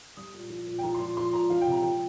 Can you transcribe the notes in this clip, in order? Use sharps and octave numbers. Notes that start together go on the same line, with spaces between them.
G3 D#6
A#2
F3
A#2
G5
F3 A#5
C6
A#2
F3 C6
A#2 A#5
F3 F5
G5
C3 A#5
F3 G5